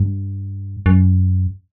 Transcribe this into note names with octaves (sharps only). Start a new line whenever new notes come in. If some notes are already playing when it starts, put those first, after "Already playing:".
Already playing: G2
F#2